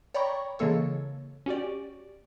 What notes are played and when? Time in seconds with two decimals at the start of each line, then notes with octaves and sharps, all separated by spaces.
0.14 C#5 D5 G5 A#5 B5 C#6
0.59 C#3 E3 G#3 A#3 A4 C#5
1.46 C#4 F#4 G4 D5